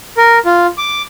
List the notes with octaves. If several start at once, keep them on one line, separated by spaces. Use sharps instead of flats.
A#4
F4
D6